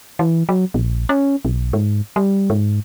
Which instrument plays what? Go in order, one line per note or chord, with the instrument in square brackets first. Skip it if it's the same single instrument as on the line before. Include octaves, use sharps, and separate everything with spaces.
[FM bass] E3
F#3
A#1
C#4
B1
G#2
G3
G#2